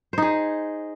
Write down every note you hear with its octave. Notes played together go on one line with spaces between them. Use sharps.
D#4 G#4 C5